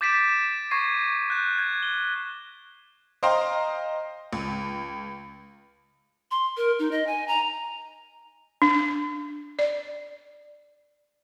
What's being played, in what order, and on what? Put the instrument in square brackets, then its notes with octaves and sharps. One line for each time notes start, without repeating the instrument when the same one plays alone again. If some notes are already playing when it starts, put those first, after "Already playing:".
[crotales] D6 G6 A6 B6 D7 E7
E7
C#6 G#6 A#6 C7 D#7
F#6 G6
G#6
G7
[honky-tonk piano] C5 D#5 F5 G5 A#5 C6
C#2
[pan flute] C6
A#4
D#4
D#5
G#5
A#5
[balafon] D4
D5